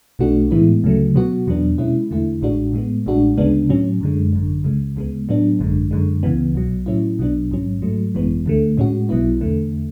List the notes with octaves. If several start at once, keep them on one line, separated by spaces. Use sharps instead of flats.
B1 B2 A3 D4 F#4
A2 E3 G#3 B3 E4
D2 C#3 F#3 A3
B2 F#3 B3 F#4
E2 B2 F#3 B3 D4
B2 G#3 C#4 E4
E2 D3 A3 E4
A1 A2 G#3 D4 F#4
A2 G#3 B3
A1 A2 G#3 D4 F#4
D2 C#3 G#3 B3 D4
A2 F#3 C#4
F#2 D3 G#3
G#1 F#2 D3
C#2 C#3 G#3
D2 C#3 G#3 B3
A2 F#3 B3 D4
G#1 F#2 D3 G#3
F#2 D3 G#3
C#2 C#3 E3 B3
B1 B2 F#3
A2 F#3 C#4 E4
B1 B2 F#3 B3 D4
A1 G#2 F#3 C#4
G#2 F#3 A3
G#1 F#2 E3 G#3 B3
D2 D3 A3
A2 G#3 C#4 F#4
B1 B2 F#3 B3 E4
E2 D3 A3